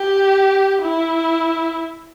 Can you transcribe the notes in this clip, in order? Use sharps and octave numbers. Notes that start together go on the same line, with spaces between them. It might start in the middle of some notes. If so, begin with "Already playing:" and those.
Already playing: G4
E4